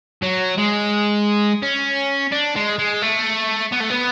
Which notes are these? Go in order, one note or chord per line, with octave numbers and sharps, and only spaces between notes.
F#3
G#3
C#4
D4
G#3
G#3
A3
B3
A3
B3